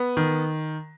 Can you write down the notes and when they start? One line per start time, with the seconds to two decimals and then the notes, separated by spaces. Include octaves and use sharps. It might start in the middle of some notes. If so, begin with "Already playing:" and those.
Already playing: B3
0.17 D#3